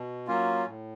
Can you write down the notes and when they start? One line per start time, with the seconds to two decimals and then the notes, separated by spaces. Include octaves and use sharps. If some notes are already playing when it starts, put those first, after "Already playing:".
Already playing: B2
0.27 F#3 A#3 C#4 F4
0.67 A2